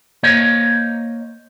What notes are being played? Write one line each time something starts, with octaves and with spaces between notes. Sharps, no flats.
A#3 C5 C#5 D#5